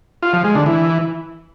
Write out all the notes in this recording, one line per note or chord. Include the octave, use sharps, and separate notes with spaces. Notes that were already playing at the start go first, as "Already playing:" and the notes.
F4
F3
G#3
D3
E3